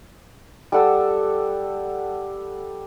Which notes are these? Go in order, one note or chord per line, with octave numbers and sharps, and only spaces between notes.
G3 A4 F#5 E6